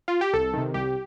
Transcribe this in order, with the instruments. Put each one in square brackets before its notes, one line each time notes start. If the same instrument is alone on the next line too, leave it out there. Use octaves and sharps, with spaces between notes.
[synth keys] F4
G4
C2 A4
C3 D#3
C2 G4